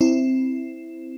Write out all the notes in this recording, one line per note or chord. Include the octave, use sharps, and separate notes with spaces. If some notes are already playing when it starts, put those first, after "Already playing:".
C4 E4